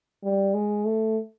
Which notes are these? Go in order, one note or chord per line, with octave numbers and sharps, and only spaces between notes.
G3
G#3
A3